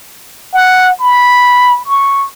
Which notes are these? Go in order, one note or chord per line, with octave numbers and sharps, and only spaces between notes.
F#5
B5
C#6